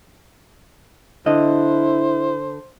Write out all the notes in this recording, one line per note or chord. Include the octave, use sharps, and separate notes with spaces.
D3 E4 C5 D#5